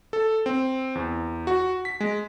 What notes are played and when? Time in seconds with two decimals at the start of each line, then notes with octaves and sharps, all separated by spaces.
0.13 A4
0.46 C4
0.95 E2
1.47 F#4
1.85 B6
2.00 G#3